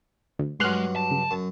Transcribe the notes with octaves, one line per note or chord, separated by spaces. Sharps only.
D2
G2 F#3 G#3 C6 F6 F#6
A5
C#3
F#2